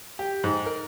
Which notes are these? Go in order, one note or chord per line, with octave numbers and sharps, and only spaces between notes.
G4
G#2
A#4